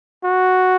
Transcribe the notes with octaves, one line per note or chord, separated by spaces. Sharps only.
F#4